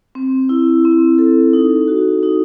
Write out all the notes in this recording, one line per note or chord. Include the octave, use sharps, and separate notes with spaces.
C4
E4
C4
A4
D#4
F#4
D#4